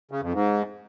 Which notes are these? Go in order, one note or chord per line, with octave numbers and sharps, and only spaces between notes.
C#3
F2
G#2